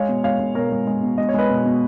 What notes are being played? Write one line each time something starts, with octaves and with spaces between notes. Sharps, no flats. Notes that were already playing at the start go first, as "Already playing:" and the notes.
Already playing: G#3 C#5 F5
B2
G#3 C#5 F5
G#3
B2 A#4 C#5
G#3
G#3
B2
G#3 D#5
C#5
G#3 B4 D#5
B2
B2